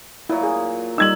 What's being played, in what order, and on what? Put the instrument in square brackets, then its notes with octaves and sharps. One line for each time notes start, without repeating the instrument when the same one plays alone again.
[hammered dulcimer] A#2 F#3 [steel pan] E4
[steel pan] G#4
[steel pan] G3 D#4 [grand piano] E6 G#6 F#7